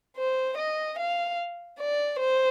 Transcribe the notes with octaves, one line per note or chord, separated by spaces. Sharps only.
C5
D#5
F5
D5
C5